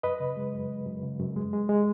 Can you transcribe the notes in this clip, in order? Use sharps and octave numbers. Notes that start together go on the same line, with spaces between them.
F#2 B4 D#5
C#3
G#3
F#2
F#2
F#2
C#3
F#2
G#3
G#3
G#3